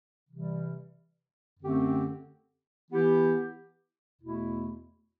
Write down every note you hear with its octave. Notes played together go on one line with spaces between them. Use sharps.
C3 E3 G3
F#2 D3 A3 C4 G4
E3 B3 E4 G4
E2 B2 A3 E4